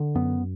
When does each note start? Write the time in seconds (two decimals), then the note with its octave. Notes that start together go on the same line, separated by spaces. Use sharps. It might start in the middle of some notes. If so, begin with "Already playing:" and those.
Already playing: D3
0.15 F#2 B3